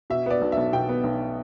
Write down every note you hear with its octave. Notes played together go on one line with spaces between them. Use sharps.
B2 E5
B3 D5
B1
B1 E5
B2 G5
B3
B1